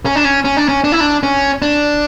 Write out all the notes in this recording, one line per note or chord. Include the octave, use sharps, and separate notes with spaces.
C#4
D4
C#4
C#4
D4
C#4
D4
E4
D4
C#4
D4